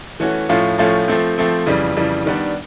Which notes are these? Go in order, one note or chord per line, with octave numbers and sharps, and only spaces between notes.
E3 A3 C#4 F#4
A2 F3 A3 C#4 F4
A2 F3 A3 C#4 F4
F3 A3 C4
F3 A3 C4
F2 C#3 E3 G3
F2 C#3 E3 G3
D#3 G3 B3 D4